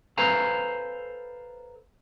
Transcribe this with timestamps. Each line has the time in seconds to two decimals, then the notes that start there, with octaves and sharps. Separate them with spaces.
0.18 A4 B4 C5 F5 G#5 A#5